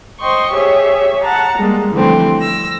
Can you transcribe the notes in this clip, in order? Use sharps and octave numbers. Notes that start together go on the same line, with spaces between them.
C5 D#5 G5 C6 C#6
G4 G#4 C#5 E5
F#5 A5 A#5
G3 G#3 A#3
D3 E3 F3 G3 A3 C4
E6 A#6